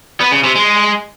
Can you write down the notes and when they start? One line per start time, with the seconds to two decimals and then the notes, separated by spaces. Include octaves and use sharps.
0.20 B3
0.32 C#3
0.44 C3
0.55 G#3